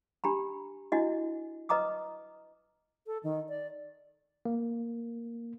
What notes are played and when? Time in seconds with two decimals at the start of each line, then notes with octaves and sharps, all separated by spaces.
0.24 D4 G4 A#5 B5
0.92 D4 E4 F#4 D#5
1.69 B4 D#5 A#5 D6 D#6
3.07 A4
3.23 D#3
3.49 D5
4.45 A#3